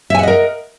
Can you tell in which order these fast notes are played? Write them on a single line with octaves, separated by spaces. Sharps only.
E5 G#5 F#5 D#5 A#4